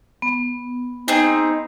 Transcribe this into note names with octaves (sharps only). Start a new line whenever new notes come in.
B3
C4 D#4 G#4